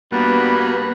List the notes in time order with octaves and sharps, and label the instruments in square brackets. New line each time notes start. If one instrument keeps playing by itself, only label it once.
[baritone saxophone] G2 [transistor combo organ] A#3 F#4 [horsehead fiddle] B3 B5